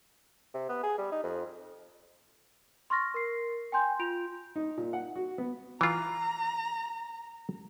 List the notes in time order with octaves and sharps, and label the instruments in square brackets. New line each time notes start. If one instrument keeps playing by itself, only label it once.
[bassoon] C3
B3
G#4
G3
D#4
F2
[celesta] C6 C#6 F6 A6 A#6
A#4 C7
G5 G#5 C6 G6
F4 G6 D7 F7
[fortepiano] D#4
A#2
F#5
F#4
B3
[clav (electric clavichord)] E3 F4 [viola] A#5